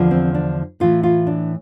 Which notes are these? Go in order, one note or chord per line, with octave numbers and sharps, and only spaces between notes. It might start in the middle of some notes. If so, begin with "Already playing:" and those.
Already playing: E2 D3 F3
C4
D4
A2 E3 F4
F4
D4